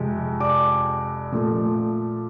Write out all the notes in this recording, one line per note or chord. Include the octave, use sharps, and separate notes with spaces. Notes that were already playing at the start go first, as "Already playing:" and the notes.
Already playing: F2 C3 F3 G#3
D5 D6
A#2 F3 A3